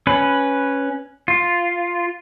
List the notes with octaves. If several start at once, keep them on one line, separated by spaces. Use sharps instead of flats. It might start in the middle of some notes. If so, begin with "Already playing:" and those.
C#4 B4
F4